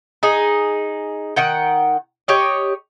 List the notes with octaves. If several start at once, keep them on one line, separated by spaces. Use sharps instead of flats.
D#4 G#4
D#3 F#5 G5
G4 C#5 D#5